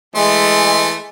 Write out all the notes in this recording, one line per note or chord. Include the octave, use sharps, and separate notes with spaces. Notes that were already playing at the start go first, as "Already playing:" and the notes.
E3 G#3 A3 C6